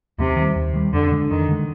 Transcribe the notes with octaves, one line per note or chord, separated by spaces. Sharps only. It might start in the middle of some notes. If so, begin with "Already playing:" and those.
D#2 C3
D#3 G3
D#2
D#3 G3
F2 D3
D3 G#3
F2 D#3
D3 G#3